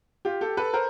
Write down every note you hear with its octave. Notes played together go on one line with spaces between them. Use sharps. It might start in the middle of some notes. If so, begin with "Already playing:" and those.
F4 G4
G4 A4
A4 B4
A#4 C5